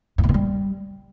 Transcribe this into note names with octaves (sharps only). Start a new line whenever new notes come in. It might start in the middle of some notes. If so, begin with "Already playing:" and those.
G2
A#2
B2
G3